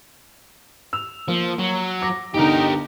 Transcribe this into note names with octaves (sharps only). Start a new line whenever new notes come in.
E6 F7
F3 A#3
F#3
D6 A#6
G1 D3 D#4 G4 A#4